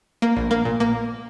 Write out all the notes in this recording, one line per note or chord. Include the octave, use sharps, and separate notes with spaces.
A#3
A#1
A#3
A#2
A#3